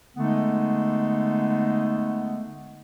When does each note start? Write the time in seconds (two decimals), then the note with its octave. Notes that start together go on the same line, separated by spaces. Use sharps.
0.16 D3 G#3 A3 B3 D#4